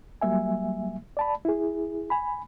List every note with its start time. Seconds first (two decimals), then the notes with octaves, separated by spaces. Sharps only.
0.21 F#3 G3 A#3 E5 G#5
1.17 D5 A5 B5
1.45 E4 G#4
2.10 G#5 B5